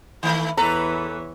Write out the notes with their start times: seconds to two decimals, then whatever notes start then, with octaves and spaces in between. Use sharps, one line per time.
0.23 D#3 A3 B4
0.57 E2 E3 A4 B4 C#5 A#5